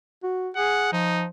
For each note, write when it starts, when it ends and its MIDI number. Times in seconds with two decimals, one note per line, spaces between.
0.23 0.50 66
0.56 0.92 68
0.56 0.90 78
0.92 1.27 53
0.92 1.25 63